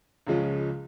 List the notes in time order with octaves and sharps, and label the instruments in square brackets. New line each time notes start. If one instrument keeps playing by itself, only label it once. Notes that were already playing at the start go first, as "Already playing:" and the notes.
[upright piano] C#2 C#3 F3 G#3 C#4